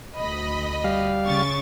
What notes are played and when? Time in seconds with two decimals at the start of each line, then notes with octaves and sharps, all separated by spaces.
0.17 D2 D#5 B5
0.84 G3 F5
1.25 C#3 C#6 A6